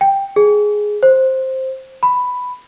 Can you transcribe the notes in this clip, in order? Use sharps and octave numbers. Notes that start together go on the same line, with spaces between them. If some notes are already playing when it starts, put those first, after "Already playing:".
G5
G#4
C5
B5